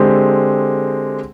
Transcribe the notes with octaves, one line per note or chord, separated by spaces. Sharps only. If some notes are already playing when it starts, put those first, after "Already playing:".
Already playing: D3 G#3 C4 G4